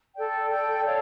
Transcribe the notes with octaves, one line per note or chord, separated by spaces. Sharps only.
A4 D5 G5
A4 D5 G5
A4 C#5 F5